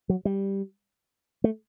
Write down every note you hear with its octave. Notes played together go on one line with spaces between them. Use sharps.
F#3
G3
A3